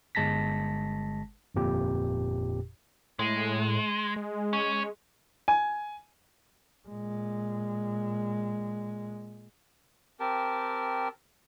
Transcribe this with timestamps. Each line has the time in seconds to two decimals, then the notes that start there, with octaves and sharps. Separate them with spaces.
0.15 G1 G#3 A5 A#6 B6
1.55 G1 F2 A#2 G4
3.19 A2 G#3
4.16 G#3
4.53 C#4
5.48 G#5
6.88 A#2 G#3
10.20 C4 G4 A#4 A5